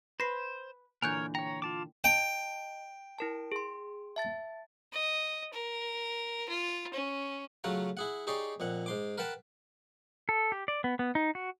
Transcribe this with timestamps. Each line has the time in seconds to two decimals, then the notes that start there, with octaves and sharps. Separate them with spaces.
0.20 B4 C5 A#6 C7
1.02 A#2 D3 E3 A#4 C#5 G#5 F#6 G6
1.35 C#5 G5 A#5
1.62 F4 A5 D6
2.04 D#5 G5 A5
3.19 E4 A#4 A5
3.52 G#4 C6
4.16 E5 A5 A6
4.93 D#5
5.53 A#4
6.48 F4
6.93 C#4
7.64 C#3 F#3 A3 F4 F#5 A#5
7.97 E4 G#4 F#5
8.27 D#4 G4 G#4 C#5 D5 C6
8.60 F2 A#2 F#5
8.86 G#2 C6 D6
9.18 A#4 B4 F#5 G5 A5
10.29 A4
10.52 G4
10.68 D5
10.84 B3
10.99 B3
11.15 D#4
11.35 F#4